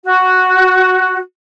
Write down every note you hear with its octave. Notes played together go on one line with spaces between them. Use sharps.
F#4